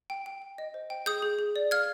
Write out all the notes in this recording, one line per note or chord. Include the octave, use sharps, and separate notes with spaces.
G5
G5
G5
D#5
C5
G5
G#4 D#6 G6
G#4
G#4
D5
F5 F6 G#6